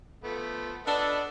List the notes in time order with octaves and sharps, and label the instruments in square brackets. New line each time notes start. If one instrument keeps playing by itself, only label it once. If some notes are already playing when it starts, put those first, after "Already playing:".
[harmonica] F3 A3 B3
[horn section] D4 A4 [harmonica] B4 D#5 F#5